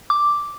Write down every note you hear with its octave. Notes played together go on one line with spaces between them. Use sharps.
D6